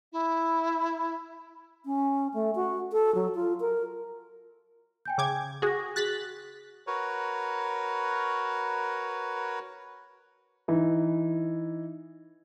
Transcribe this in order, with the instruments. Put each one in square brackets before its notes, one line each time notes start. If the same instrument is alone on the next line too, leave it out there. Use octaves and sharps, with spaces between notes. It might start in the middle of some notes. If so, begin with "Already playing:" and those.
[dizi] E4
[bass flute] C#4
A3
F#4
A4
F#3
F4
A#4
[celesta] G5 G#5 G6
[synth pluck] C#3 D6 G#6
[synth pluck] F#4 G#4 [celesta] C#6 A#6
[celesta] F#4 G#4 F#7 [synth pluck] F#6 A6 B6
[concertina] F#4 A#4 B4 C#5
[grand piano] E3 D#4